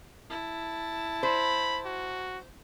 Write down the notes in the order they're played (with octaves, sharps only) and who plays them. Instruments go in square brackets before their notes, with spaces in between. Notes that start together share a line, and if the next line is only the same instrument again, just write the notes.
[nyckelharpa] E4 A5
[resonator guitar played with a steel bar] C5 [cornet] B5
[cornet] F#4